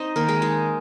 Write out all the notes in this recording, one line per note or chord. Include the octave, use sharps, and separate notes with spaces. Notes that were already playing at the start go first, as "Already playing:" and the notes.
Already playing: C4 D#4 C5 D#5
D#3 A#3 A#4
G#3 G#4
G#3 D#4